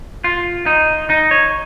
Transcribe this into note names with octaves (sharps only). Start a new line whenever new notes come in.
F4
D#4
D#4
C#5